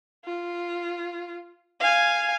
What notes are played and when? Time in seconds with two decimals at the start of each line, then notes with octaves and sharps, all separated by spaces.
0.25 F4
1.80 F5 G#5